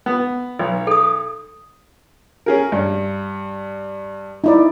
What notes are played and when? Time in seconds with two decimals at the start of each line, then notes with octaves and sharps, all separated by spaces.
0.06 B3
0.59 B1
0.87 A4 D#6
2.46 C#4 G#4 A#4
2.72 G2
4.44 D#4 E4 D5